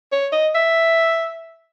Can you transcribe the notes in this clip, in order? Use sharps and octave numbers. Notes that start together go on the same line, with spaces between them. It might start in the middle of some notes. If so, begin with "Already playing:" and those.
C#5
D#5
E5